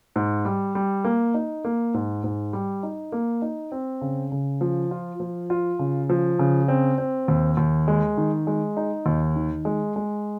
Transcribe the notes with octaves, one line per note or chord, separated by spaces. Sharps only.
G#2
G3
G3
A#3
D#4
A#3
G#2
G#2
G3
D#4
A#3
D#4
C4
C#3
C#3
F3
F4
F3
F4
C#3
F3
C#3
C4
C4
D#2
D#2
G#3
D#3
G#3
D#4
D#2
D#3
G#3
G#3